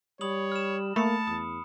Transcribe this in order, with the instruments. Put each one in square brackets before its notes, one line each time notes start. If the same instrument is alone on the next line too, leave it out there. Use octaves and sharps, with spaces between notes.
[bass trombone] G3 [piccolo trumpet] C#5 [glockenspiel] B5 D#6 F#7
[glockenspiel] F6 E7
[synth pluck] A3 [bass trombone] A#3 [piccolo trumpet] A5 [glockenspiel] B5 D#6 C#7
[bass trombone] E2 [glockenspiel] D#6